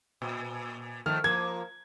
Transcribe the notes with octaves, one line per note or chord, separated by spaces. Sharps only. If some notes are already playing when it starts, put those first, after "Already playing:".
A#2
D#3 F3 A3 F6
F3 A#3 G#6